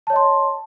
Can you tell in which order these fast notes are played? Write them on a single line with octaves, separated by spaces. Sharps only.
A5 C#5 D#5 C6